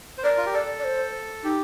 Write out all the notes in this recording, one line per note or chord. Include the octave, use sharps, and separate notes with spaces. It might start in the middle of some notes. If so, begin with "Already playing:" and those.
C5
A#4 D5
F4
G4
A4 D5
D5
C5
D#4 G4